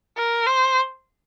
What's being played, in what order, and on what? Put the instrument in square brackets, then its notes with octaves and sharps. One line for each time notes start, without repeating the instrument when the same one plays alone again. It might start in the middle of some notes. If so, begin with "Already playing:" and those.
[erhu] A#4
C5